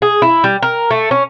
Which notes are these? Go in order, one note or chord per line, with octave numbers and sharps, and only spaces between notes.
G#4
E4
G3
A#4
A3
C#4